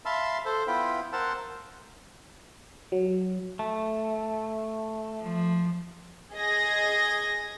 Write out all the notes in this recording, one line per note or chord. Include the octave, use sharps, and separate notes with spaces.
E5 F5 A5 B5 C6 E6
A4 C5
B3 E4 F4 G5 B5
A#4 C5 F#5 A5 E6
F#3
A3
F3
G#4 D#5 G#6 A#6